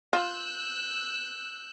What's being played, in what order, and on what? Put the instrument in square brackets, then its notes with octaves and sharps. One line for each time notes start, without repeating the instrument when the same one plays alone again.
[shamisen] F4 [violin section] E6 F#6 G6